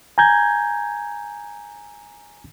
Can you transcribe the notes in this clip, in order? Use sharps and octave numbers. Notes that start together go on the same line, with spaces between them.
G#5 A#5 G6 G#6